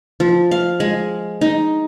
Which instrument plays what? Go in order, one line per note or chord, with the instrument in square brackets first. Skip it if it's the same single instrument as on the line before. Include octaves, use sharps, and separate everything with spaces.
[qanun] F3
F5
G#3
D#4